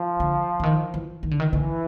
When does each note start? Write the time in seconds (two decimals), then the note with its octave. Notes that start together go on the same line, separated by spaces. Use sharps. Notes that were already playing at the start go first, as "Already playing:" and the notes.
Already playing: F3
0.20 D3
0.60 D3
0.63 D#3
0.94 E3
1.23 D#3
1.31 D3
1.40 D#3
1.52 D3 E3